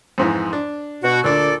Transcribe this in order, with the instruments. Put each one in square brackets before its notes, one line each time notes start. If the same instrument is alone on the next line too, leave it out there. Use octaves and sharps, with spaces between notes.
[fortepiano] F2 G#2 E3
D4
[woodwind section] B2 F#4
[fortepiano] D2 D4 [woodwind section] A#2 A4 D5